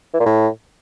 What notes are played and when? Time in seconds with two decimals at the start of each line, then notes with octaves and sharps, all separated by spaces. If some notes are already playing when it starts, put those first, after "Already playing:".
0.14 E3
0.20 A#2
0.26 A2